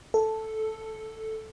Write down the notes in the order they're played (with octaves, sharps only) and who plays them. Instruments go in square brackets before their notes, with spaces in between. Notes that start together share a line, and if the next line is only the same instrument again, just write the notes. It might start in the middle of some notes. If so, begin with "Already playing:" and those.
[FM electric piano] A4